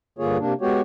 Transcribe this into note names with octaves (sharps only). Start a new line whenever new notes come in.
G2 D3 A#3 F4 G#4 C#5
C3 A#3 D4
G#3 B3 F#4 G4 C#5